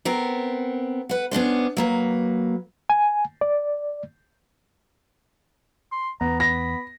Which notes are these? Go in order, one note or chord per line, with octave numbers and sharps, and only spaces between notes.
B3 C4 A#4
B4 F#5
B3 C#4 D4 C5
F#3 A#3 B4
G#5
D5
C6
E2 B3 A#5
B5 A#6